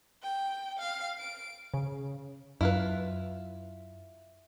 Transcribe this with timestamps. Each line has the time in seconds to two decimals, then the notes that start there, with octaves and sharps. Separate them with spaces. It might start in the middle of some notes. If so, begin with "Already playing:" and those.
0.22 G5
0.79 F5
1.19 D7
1.74 C#3
2.61 F#2 E4 F4 B4